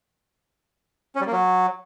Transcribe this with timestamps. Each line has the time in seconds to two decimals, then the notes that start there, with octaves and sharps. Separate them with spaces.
1.15 C#4
1.21 G3
1.27 A#3
1.32 F#3